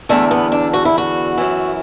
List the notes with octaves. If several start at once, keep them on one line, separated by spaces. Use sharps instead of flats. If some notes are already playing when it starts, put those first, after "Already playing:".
E2 D3 A3
B3
D4
F#4
E4
F#4
F#2 E3